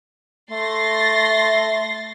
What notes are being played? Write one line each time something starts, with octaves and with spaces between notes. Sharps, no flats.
A3 C6 A6 A#6